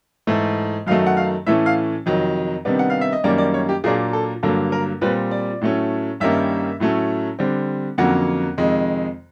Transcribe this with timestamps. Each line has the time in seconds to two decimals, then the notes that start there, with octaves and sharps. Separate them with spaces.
0.27 G#2 E3 A3
0.86 F#2 D#3 F#3 A3 F5
1.06 F#5
1.17 F5
1.47 A2 E3 A3 C#4 E5
1.66 F5
2.06 F2 C3 D#3 F#3
2.65 C3 D#3 G3 B3 D4
2.79 F#5
2.90 F5
3.01 E5
3.13 D#5
3.24 F#2 D#3 G3 A#3 C#4 D5
3.38 D5
3.54 C#5
3.69 G4
3.84 A#2 F#3 A#3 D4 G#4
4.13 A4
4.43 G2 D3 F#3 A#3 A4
4.72 A#4
5.01 A#2 G3 C4 B4
5.31 D5
5.61 A2 F#3 A3 C#4
6.20 G2 D#3 G3 A#3 C#4 E5
6.80 A2 F#3 A3 C#4
7.39 D3 G3 C4
7.98 F2 D3 F#3 A#3 C#4 F#5
8.57 F2 C3 D#3 G#3